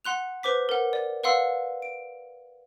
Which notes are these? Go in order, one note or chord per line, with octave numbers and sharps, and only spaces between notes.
F#5 C6 F#6 F7
B4 C5 D6 B6
A#4 F#5
D5
B4 D5 F5 F#5 C6 E6
D7